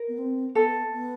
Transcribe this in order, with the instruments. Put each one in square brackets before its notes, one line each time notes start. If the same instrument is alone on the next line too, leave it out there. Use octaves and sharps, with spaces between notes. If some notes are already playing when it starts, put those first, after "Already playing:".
Already playing: [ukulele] A#4
[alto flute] B3
C4
[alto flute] B3 [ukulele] A4
[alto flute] B3